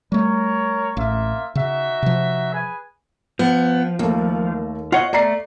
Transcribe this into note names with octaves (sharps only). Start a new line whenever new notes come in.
G3 A3 A#4 C#5
A1 A#3 F4 E5
C#3 D#4 F#4 E5
C3 F3
G#4 B4 G#5
F3 B3
D#2 A3 A#3
F4 C#5 D#5 F#5
A3 D5 A#5 C7